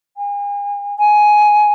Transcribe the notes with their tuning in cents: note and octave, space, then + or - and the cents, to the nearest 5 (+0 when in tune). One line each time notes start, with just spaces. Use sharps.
G#5 -40
G#5 +10